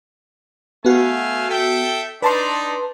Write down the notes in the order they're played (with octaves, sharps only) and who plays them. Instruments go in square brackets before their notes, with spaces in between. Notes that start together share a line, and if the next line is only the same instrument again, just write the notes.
[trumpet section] A3 F5 G#5 [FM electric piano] B3 F#4
[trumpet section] A4 E5 G5
[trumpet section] D4 D#4 [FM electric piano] B4 A5 C6